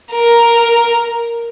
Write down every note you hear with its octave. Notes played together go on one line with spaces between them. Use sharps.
A#4